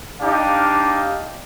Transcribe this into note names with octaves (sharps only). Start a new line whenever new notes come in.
D4 D#4 G4 F5